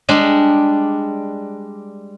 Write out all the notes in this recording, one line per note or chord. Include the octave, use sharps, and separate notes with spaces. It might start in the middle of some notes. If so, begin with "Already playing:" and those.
G3 G#3 D4